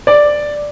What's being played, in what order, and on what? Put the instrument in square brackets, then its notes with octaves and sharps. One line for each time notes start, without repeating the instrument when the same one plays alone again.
[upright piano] D5